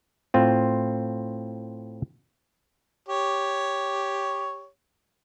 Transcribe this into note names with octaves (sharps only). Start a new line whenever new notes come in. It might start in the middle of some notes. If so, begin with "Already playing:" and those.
A2 C4 F4
G4 C#5